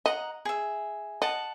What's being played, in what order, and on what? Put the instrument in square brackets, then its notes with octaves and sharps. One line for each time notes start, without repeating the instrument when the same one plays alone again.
[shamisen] D#5 [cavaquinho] F#5 A#5
[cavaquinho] G#4 E5
[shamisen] D#5 [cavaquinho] F#5 A5